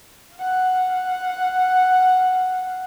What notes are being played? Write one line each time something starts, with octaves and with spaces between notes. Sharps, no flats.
F5 F#5